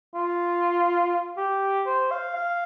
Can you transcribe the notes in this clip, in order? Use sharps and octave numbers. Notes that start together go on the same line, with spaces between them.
F4
G4
C5
F5
F5